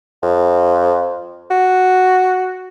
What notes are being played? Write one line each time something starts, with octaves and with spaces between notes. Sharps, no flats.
F2
F#4